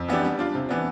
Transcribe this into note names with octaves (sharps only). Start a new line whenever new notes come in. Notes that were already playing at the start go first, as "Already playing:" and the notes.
Already playing: F2
E3 B3 D4 G4
G3
D4 F4
C3
E3 B3 D4